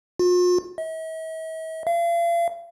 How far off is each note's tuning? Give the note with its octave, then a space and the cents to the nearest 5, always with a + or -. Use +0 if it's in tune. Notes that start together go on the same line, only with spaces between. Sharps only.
F4 +45
E5 -45
F5 -40